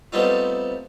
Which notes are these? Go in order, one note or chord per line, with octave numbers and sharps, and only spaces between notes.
G3 A3 B3 C4 D#4 F4